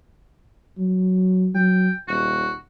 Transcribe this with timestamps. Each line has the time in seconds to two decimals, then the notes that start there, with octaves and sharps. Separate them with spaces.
0.78 F#3
1.54 F#3 G5
2.08 D#1 F#4